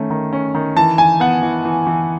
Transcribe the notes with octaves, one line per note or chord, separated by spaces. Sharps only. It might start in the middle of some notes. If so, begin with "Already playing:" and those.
Already playing: D#3 A3 C#4
D#3
C#4
D#3
E3 A5
E3 G#5
B3 F#5
E3
E3
E3